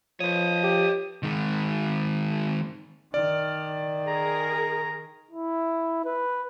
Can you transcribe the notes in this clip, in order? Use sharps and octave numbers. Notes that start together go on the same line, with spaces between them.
F3 B4 C#5 D#6
G4
D#3 G#3
D#3 D5 F6
G#4 A#4 A#5
E4
B4